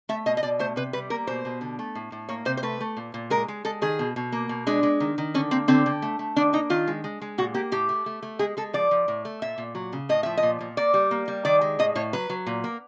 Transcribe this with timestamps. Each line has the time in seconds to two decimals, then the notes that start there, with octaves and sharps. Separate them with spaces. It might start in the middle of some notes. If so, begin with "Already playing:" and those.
0.09 A3 E5
0.26 B2 D#5
0.37 D#5
0.43 B2 D5
0.59 A3 C5
0.76 C3 B4
0.93 G3 B4
1.10 A#3 A#4
1.27 B2 C5
1.45 B2
1.61 D3
1.79 A3
1.95 A2
2.12 A2
2.29 A#3 C#5
2.45 C3 C5
2.57 C5
2.63 A3 B4
2.81 A3
2.97 A#2
3.14 A#2
3.30 G#3 A#4
3.48 G#3
3.65 G#3 A4
3.82 D#3 G#4
3.99 B2
4.16 B2
4.32 A#3
4.49 B2
4.67 G#3 D4
4.83 G#3
5.00 D#3
5.18 D#3
5.34 D3 C#4
5.51 A#3 C4
5.68 D3 C4
5.86 D3
6.02 A3
6.19 A3
6.36 D#3 D4
6.53 A#3 D#4
6.70 D#3 F4
6.87 G#3
7.04 G#3
7.21 G#3
7.38 A#2 F#4
7.54 A#3 G4
7.72 A2 G4
7.89 A3
8.06 A3
8.23 A3
8.39 G#3 G#4
8.57 G#3 A4
8.73 F3 D5
8.91 F3
9.08 A2
9.25 A3
9.42 A#2 E5
9.58 A#2
9.75 F#3
9.93 C#3
10.09 A2 D#5
10.23 F3 E5
10.37 D#5
10.43 A#2
10.61 A#2
10.77 A#3 D5
10.94 G3
11.11 A#3
11.28 G3
11.45 D#3 D5
11.61 G#3
11.79 A2 D#5
11.95 A2 C#5
12.13 F#3 B4
12.29 F#3
12.47 A#2
12.64 A#3